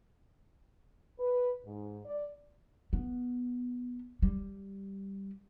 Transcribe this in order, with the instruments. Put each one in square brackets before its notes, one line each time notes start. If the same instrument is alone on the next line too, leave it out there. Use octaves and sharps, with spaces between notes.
[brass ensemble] B4
G#2
D5
[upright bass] B3
G3